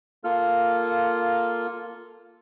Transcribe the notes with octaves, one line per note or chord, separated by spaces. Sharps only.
A#3 F4 A4 F6